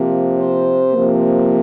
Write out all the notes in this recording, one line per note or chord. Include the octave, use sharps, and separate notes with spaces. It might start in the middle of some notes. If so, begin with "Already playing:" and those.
Already playing: C3 F3 A#3
C5
C3 F3 A#3